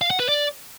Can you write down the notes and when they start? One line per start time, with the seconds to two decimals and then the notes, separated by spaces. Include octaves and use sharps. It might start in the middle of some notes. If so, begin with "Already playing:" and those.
0.01 F5
0.10 F#5
0.20 B4
0.29 D5